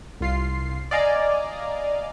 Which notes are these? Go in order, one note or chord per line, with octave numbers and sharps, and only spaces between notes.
C2 F4 C7
D5 D#5 F5 G#5 A#5